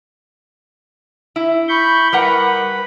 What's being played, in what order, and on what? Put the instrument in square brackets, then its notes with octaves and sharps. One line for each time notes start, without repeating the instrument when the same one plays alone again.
[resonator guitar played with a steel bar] E4
[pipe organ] B5 C#6 G6
[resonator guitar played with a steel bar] G3 A#4 F#5 [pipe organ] B4 B5